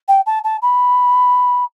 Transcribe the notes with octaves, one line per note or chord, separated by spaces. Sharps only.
G5
A5
A5
B5